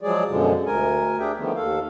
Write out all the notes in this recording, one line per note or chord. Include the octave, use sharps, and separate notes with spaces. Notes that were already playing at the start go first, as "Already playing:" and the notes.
F3 F#3 G#3 G#4 D5
F#2 B2 D3 F3 G#3
D2 A#4 G#5
D4 G4 G#4 E5 G5
D3 D#3 F3 A3 B3
D#2 A4 F5